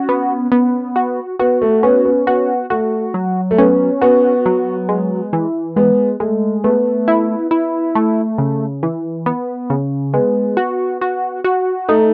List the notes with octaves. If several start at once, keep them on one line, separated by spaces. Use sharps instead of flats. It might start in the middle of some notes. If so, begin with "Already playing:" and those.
Already playing: C#4 F#4
B3
B3
F#4
B3 F#4
A3
B3 C#4
B3
B3 F#4
A3 F#4
F#3
A3
B3 C#4
B3 F#4
F#3
G#3
E3
G#3 B3
G#3 A3
A3 B3
E4
E4
A3
C#3
E3
B3
C#3
G#3 B3
F#4
F#4
F#4
A3 D#4